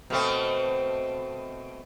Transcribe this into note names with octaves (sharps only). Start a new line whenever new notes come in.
B2 A3 C4